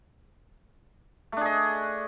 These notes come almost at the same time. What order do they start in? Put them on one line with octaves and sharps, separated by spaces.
A3 D4 G#4 D#5